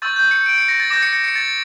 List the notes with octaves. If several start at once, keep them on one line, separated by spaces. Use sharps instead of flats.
C#6 E6 G6 A6
G6
C#7
D7
C#7
A#6
A6
D6 G6 A#6
C#7
A#6
C#7
A6